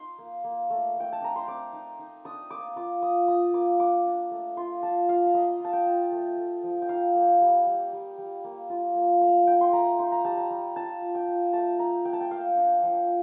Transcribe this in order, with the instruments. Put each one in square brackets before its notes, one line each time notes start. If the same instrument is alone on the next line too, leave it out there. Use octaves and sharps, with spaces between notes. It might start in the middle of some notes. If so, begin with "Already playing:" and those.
Already playing: [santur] D#4 C6
A#3
A#3
A3
A3 G5
A5
D4 A#5
C6
C4 D6
D#4
D#4
D4 D#6
A#3 D6
F4 D6
F4 D#6
F4 D#6
A#3 D6
D4 D6
D4
A3
F4 C6
F4 A5
F4 F5
F5
A#3 D#5
F4 A5
G5
F4
A3
A3
F3
G5
D#4 F5
A#3
G3
G3
G3
G3
A#3
F4
A#3
A3 F5
D#4 G5
C6
A3 A#5
D#4 C6
A#5
G3 A5
A#5
G3
F4 A5
F4
G5
F4
A3 A5
D#4 A#5
A3 G5
A5
G5
A#3 F5
D4
F3